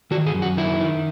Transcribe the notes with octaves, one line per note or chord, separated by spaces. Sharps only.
D#3 F#4
G#4
F#2
F#4
D#3 E4
D#3